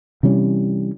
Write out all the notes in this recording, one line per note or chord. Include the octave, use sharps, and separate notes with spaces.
C3 E3 G3 C#4